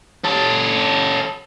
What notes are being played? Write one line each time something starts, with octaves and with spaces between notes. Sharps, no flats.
C#4 A4